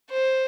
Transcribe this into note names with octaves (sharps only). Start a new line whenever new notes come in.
C5